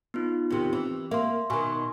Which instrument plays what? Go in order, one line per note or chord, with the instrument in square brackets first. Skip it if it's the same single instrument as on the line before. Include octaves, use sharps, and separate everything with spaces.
[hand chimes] B3 D#4 F4
[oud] D#2 C3
E3
[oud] A#3 [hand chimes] E5 C6
[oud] B2 D#3 [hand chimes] G#5 C6 C#6